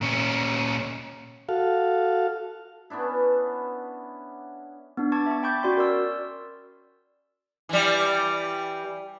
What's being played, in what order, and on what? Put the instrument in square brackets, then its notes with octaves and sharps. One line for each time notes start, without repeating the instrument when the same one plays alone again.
[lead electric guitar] A#2 C#4
[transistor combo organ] F#4 A4 F5
[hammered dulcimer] B3 C#4 D4 E4
[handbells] B3 D4
A5 C#6 D6 G#6 A6
E5 C#6
G5 B5 C#6 D6 G6 A6
C#4 F#4 D5 C6
A#4 D5 E6
[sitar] E3 G3